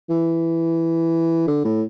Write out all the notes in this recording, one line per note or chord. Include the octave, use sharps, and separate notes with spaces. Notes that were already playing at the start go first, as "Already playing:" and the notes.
E3
D3
A2